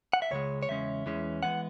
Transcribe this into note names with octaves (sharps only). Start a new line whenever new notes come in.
F#5
E5
C#2 C#3 G#3 C#5
C#5
E2 C#3 G#3 C#4 E5
E2 E3 G#3 C#4
E3 G#3 B3 F#5